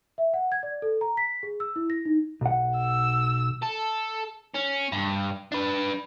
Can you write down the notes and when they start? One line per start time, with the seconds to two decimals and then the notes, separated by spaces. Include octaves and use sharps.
0.18 E5
0.34 F#5
0.52 G#6
0.63 D5
0.82 A4
1.01 A#5
1.17 B6
1.43 G#4
1.60 E6
1.76 E4
1.90 A#6
2.05 D#4
2.41 B1 F#5
2.77 E6
3.63 A4
4.54 C#4
4.92 G2
5.52 D4 B4